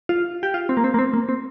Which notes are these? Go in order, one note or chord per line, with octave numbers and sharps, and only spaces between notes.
F4
G4
F4
C4
A#3
C4
A#3
C4
A#3
C4